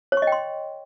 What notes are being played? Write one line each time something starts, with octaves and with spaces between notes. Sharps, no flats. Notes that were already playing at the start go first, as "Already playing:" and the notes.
C#5
C#6
D#5
G5
C6